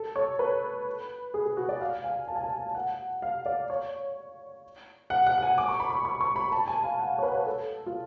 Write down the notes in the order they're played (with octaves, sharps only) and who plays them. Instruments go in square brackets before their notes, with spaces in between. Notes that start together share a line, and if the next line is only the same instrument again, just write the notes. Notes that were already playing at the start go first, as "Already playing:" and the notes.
Already playing: [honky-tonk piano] A4
C#5
B4
G#4
G#4
F#4
D5
F5
G#5
A5
G#5
A5
F#5
F5
D5
C#5
F#5
F#5
F#5
G#5
D6
C#6
B5
C#6
C#6
C#6
B5
A5
G#5
F5
F#5
C#5
B4
C#5
B4
A4
F4